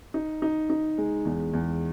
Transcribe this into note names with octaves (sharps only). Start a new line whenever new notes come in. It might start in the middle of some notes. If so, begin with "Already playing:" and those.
D#4
D#4
D#4
G#3
E2
E2